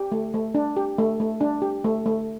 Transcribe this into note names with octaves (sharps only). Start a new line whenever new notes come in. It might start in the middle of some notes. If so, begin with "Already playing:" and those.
Already playing: G4
A3
A3
D4
G4
A3
A3
D4
G4
A3
A3